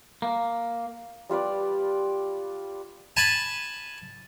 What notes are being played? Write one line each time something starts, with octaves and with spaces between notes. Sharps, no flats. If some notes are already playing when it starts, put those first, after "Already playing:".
A#3
G3 F4 B4 D5
G#5 A5 B5